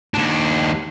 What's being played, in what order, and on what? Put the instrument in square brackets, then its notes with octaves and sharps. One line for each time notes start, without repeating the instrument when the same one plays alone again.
[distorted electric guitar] D#2 D4